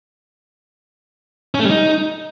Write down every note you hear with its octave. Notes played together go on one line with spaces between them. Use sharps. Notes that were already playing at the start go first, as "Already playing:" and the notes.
C#4
A3
G3
D#4